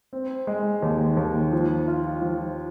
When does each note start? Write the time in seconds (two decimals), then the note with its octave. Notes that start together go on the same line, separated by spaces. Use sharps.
0.13 C4
0.47 G#3
0.82 D#2
1.17 D#2
1.52 F3
1.87 F4
2.22 F3